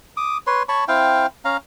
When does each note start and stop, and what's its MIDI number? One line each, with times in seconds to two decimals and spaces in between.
0.17 0.38 86
0.17 0.38 87
0.47 0.63 71
0.47 0.63 73
0.47 0.63 84
0.69 0.84 73
0.69 0.84 81
0.69 0.84 83
0.69 0.84 85
0.88 1.26 60
0.88 1.26 64
0.88 1.26 77
0.88 1.26 79
1.45 1.57 61
1.45 1.57 77
1.45 1.57 82